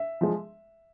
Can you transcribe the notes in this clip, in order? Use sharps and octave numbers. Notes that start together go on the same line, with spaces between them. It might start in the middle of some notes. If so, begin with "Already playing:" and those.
Already playing: E5
F3 G#3